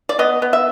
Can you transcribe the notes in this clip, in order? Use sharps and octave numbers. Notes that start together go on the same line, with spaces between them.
D5
B3 D#5
B3
E5